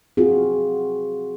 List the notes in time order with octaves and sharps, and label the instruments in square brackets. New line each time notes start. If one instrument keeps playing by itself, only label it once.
[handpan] C4 F4 F#4 G#4